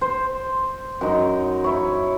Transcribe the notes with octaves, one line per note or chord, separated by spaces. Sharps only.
C5
F#2 D#4
E4 C#5